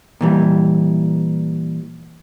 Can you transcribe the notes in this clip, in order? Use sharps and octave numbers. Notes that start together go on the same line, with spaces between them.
A#2 E3 G3